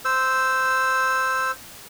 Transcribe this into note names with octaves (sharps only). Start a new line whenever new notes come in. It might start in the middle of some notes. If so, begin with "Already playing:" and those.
C5 E6